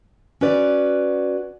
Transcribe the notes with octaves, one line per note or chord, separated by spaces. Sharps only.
C#4 F#4 B4 D5